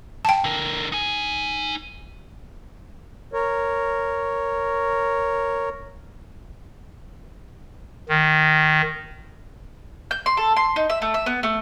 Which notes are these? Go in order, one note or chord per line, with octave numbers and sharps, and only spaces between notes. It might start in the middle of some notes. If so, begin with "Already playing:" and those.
G5 A5
D3 A#4
D#4 G#5
A#4 C#5
D#3
G6
C6
A4
C6
D#4
E5
A3
E5
B3
A3